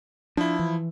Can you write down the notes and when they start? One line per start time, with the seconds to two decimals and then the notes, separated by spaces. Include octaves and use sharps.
0.37 F3 D4 E4
0.59 E3